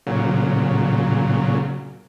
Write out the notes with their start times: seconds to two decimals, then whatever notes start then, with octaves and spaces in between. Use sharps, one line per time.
0.07 A#2 C#3 F#3